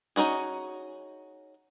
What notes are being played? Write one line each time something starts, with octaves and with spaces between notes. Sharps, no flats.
C#4 D#4 E4 F#4 G#4